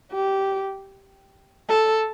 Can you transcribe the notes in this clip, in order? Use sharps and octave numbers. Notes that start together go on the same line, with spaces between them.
G4
A4